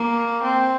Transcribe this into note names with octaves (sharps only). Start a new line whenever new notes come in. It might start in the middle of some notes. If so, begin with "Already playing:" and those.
Already playing: A#3
C4